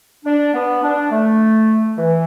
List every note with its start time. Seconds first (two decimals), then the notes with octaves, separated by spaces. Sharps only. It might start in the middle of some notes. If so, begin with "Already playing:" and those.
0.24 D4
0.53 B3
0.82 D4
1.11 A3
1.97 E3